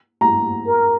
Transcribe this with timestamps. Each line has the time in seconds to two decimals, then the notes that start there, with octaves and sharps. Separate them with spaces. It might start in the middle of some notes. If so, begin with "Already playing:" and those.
0.21 A#5
0.67 A#4